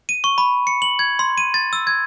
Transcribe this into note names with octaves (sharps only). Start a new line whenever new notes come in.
D#7
C#6
B5
C#7
F#7
G#6
C6
D#7
A6
E6
G#6